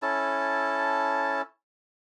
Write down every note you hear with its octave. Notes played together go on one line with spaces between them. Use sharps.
C#4 E4 A4 A5